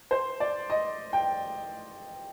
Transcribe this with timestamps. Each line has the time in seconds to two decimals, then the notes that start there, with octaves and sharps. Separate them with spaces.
0.11 C5
0.40 D5
0.70 D#5
1.13 G5